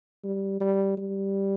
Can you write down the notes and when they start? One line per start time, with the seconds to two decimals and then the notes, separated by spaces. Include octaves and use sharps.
0.24 G3
0.60 G3
0.98 G3